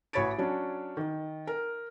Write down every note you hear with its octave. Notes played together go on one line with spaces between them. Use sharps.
A1 F#4 C#5 B5 A6 D7
F#3 C#4 D4
D#3
A#4